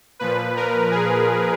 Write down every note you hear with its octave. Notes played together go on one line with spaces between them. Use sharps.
A#2 F3 B4
A#4
G#4